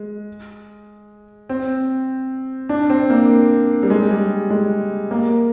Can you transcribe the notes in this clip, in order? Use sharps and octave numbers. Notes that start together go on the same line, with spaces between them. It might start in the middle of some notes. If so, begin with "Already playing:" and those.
Already playing: G#3
C4
D4
C4
A#3
G3
G#3
G3
G#3
A#3